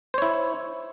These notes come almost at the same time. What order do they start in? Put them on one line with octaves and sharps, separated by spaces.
C5 C#5 E4